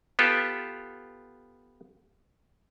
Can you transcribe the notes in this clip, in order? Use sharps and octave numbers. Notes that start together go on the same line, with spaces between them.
B3 F4 G4 A4